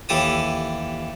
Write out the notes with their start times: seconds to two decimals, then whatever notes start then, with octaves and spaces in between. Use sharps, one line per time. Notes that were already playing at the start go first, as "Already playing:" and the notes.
0.09 D#2 E3 G4 A4 A5 D#6